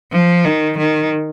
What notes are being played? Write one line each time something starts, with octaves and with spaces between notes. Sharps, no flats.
F3
D#3
D#3